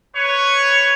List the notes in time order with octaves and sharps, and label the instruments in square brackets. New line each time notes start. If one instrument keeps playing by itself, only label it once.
[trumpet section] B4 C#5